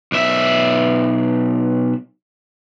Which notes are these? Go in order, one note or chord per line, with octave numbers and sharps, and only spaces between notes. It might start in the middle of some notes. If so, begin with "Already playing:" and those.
B1 E5